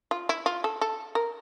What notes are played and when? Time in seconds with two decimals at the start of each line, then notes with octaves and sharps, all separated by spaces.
0.11 F4
0.29 E4
0.46 F4
0.64 A4
0.81 A4
1.15 A#4